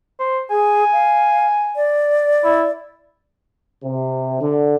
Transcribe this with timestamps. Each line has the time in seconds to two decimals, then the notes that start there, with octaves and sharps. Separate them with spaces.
0.20 C5
0.50 G#4 G#5
0.92 F5
1.76 D5
2.44 E4
3.84 C3
4.41 D3